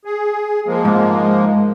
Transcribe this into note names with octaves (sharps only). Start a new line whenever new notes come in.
G#4
F3 G#3 A#3
G#2